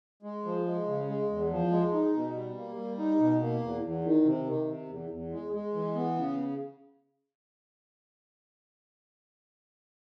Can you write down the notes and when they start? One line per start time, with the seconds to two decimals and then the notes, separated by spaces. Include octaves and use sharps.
0.23 G#3
0.45 F3
0.65 G#3
0.87 C#3
1.08 G#3
1.29 E2
1.50 F3
1.71 G#3
1.93 D#4
2.14 B2
2.35 G3
2.57 A#3
2.77 G3
2.98 D#4
3.19 B2
3.41 A#3
3.62 E2
3.83 E2
4.04 D#3
4.25 C3
4.47 D#3
4.67 C3
4.88 E2
5.10 E2
5.31 G#3
5.53 G#3
5.74 E3
5.95 B3
6.16 C#3